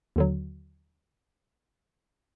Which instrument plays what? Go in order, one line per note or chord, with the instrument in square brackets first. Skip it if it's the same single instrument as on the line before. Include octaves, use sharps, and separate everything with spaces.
[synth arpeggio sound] D#2 D3 F#3